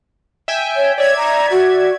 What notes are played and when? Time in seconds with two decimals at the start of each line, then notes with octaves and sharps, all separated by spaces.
0.48 E5 G5 G#5
0.76 C#5
0.98 C#5 D5 E5 G#6
1.17 A#5
1.51 F#4